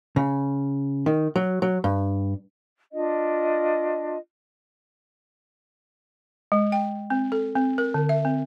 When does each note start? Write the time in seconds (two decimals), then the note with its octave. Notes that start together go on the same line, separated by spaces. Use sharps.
0.16 C#3
1.06 D#3
1.36 F#3
1.62 F#3
1.84 G2
2.91 D4 F4 D#5
6.52 G#3
6.72 G5
7.10 C4
7.32 A4
7.56 C4
7.78 A#4
7.94 D3
8.09 E5
8.25 C4